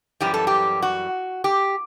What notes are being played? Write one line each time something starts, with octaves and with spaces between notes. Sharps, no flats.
F#2 E3 G3 G4
A4
G4
F#4
G4